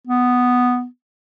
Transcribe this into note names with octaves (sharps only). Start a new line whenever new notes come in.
B3